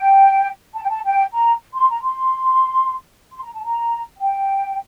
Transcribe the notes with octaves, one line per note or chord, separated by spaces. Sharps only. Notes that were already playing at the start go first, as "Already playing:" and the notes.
Already playing: G5
A5
G5
A5
G5
A#5
C6
A#5
C6
C6
A#5
A5
A#5
G5